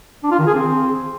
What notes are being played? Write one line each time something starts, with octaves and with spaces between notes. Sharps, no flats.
D4
F4
D#3
G#4
C4